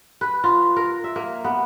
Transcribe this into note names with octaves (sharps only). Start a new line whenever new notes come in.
B4
F4
A#4
E5
A#3
B3